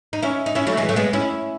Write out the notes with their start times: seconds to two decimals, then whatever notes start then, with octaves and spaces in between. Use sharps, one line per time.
0.13 D#4
0.22 C#4 E4
0.46 D#4
0.55 C#4 E4
0.67 F#3 A3
0.77 E3 G#3
0.89 F#3 A3
0.96 G#3 B3
1.13 C#4 E4